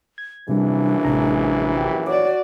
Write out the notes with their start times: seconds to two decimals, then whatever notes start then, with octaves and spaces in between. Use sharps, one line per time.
0.18 G#6
0.49 A#1 F#2 C3 E3 G3 D4
1.04 A1 C3 G#3 A#5
1.75 G4
2.07 F#4 C#5 D5 D6